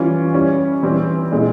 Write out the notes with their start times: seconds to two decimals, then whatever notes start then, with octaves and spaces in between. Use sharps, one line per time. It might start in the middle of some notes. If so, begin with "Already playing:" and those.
Already playing: E3 G3 C#4 F4
0.34 G3 C#4 E4
0.83 E3 G3 C4 E4
1.31 A#2 G#3 C4 E4